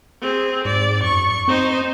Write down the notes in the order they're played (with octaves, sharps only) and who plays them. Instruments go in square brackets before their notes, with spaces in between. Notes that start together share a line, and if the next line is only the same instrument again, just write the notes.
[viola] C4 G#4
[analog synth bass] G#2 [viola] D5
[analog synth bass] F#2 [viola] C#6
[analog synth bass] C4 [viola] D#4 C5